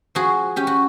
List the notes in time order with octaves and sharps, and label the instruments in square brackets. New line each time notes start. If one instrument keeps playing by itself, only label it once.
[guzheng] F3 F#4 G#4
C#4 G4
F#4